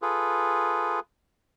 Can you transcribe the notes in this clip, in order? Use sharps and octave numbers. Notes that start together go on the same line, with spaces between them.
F4 G#4 A4 B4